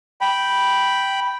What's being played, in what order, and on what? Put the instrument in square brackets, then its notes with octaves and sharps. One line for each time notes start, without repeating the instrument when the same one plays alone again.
[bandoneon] G5 B5